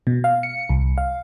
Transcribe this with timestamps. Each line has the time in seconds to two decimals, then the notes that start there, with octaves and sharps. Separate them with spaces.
0.07 B2
0.24 F5
0.43 C#7
0.69 C2
0.98 F5